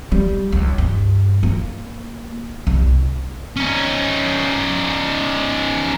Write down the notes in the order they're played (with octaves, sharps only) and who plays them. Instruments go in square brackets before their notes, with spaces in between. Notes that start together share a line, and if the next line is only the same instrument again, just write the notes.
[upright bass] G3
C#2
G2
A#3
C2
[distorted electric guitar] C#4 D#4